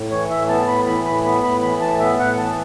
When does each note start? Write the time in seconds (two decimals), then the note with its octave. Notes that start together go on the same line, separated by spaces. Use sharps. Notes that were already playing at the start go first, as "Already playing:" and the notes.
Already playing: A2
0.11 E3 C#5
0.30 A2 E5
0.48 B3 A5
0.67 A2 B5
0.87 E3 B5
1.06 A2 B5
1.24 B3 B5
1.43 A2 B5
1.62 E3 B5
1.81 A2 A5
2.00 B3 E5
2.19 A2 F#5
2.38 E3 A5